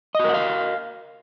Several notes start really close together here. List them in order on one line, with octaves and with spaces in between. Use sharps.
D#5 F#4 A#4 F#5 F5